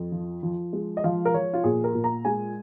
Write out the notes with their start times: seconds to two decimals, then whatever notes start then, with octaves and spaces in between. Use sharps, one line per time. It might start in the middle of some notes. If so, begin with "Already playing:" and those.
Already playing: F2
0.12 F3
0.43 F3
0.73 G#3
0.97 D#5
1.04 F3 F5
1.25 A#4
1.34 F3 C#5
1.53 F4
1.64 A#2 G#4
1.84 A#4
1.94 A#2
2.04 A#5
2.25 G#3 G#5